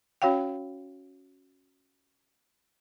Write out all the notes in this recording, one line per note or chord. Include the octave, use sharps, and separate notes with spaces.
C#4 F#4 C#5 F5 G5